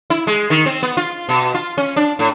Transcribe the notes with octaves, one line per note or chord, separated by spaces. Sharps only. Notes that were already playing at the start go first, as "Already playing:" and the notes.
E4
G#3
D#3
C4
B3
F4
B2
F4
C#4
D4
A2